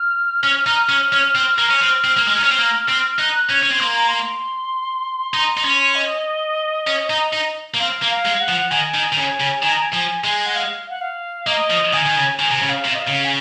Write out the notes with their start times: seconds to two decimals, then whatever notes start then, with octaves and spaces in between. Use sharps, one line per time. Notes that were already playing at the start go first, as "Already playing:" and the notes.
Already playing: F6
0.43 C#4
0.66 D#4
0.89 C#4
1.12 C#4
1.35 C4
1.58 A#3
1.70 C#4
1.82 C4
2.04 C4
2.17 A#3
2.27 G#3
2.36 D#4
2.43 C#4
2.50 C4
2.58 A#3
2.89 C4
3.19 D#4 F#6
3.50 C#4 G#6
3.63 C#4
3.72 C4
3.80 A#3 C6
3.95 A#5
4.08 C6
5.34 D#4
5.57 D#4
5.64 C#4
5.95 D#5
6.87 C#4
7.10 D#4
7.33 D#4
7.74 A#3
7.79 C4 F5
8.02 A#3
8.10 F5
8.25 G#3
8.41 F#5
8.48 F3
8.71 D#3 G#5
8.94 D#3
9.12 D#3
9.17 C#3 G#5
9.40 C#3
9.63 D#3 G#5
9.73 A#5
9.82 G#5
9.93 F3 G#5
10.24 G#3 G#5
10.46 F#5
10.55 F5
10.90 F#5
11.01 F5
11.46 A#3 D#5
11.70 F3
11.93 D#3 G#5
12.06 D#3
12.16 C#3
12.39 D#3 G#5
12.51 C3
12.62 C#3
12.69 F5
12.85 C3
12.94 D#5
13.00 F5
13.08 C#3
13.25 G#5